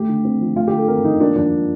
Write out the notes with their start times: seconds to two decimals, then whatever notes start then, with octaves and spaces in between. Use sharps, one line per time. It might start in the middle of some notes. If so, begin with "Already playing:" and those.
Already playing: A3 G4
0.09 D3
0.25 C4
0.41 F3
0.56 A3 F4
0.67 G4
0.73 D3
0.78 A4
0.88 C4 A#4
1.04 F3 D#4
1.20 A#3 D4
1.36 F2 D4